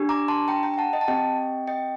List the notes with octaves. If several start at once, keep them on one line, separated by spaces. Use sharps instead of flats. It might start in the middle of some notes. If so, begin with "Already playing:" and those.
Already playing: D4 G4
A#5 D6
A5 C6
G5 A#5
G5 A#5
A#5
F#5 A5
D#5 G5
A5
C4 G4 D#5 G5
D#5 G5